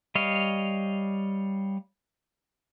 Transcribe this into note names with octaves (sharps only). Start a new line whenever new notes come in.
G3 C#5 D#5 F5